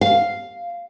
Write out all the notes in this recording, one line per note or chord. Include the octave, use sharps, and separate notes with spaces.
F5